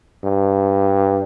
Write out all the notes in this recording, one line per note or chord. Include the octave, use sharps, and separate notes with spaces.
G2